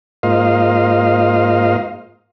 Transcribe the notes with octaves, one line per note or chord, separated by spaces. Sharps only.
G#2 A#3 F4 C5 D#5 F5